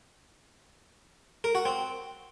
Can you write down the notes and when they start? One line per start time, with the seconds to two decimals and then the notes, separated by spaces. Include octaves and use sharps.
1.44 A#4
1.55 F#4
1.65 C4